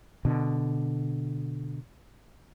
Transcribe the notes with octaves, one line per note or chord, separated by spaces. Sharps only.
B2 D3